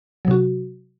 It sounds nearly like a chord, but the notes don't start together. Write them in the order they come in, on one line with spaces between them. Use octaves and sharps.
F#3 C3 F#4